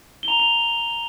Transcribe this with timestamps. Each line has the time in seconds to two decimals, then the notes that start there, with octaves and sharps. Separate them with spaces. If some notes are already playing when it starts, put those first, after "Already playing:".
0.23 G7
0.28 A#5 F7
0.40 F7